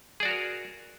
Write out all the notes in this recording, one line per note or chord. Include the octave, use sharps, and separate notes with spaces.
F#4 G#4 A#4 D5 A#5